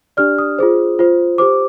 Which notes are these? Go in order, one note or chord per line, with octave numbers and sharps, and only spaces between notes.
D4 G4 D5 F6
D#6
F4 G#4 C5
F4 C5
G4 C5 D6